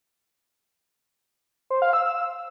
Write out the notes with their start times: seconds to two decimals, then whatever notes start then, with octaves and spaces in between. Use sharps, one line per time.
1.70 C5
1.82 F5
1.93 E6
2.05 E6